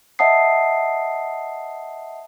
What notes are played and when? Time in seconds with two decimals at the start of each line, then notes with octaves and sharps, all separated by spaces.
0.19 D#5 E5 F#5 A5 D#6 C7